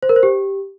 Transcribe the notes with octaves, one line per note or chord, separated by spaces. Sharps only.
C5
A#4
C5
G4